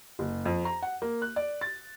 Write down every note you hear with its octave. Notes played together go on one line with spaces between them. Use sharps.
F#1
F2
A#5
F#5
A#3
F#6
D5
A6